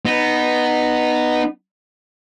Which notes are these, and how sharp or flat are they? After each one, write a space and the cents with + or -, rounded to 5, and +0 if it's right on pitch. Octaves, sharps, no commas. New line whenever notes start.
B3 +0 D#4 -15